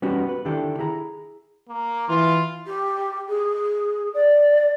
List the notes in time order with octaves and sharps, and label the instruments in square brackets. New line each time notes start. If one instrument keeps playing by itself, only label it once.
[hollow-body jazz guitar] G3 B3 C#4 D#4 F#4 G4
B4
D3 D#3 D4 E4 G4 A4
E4 G#4 A#5
[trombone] A#3
[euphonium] E3 [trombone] F4
[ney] G4
G#4
D5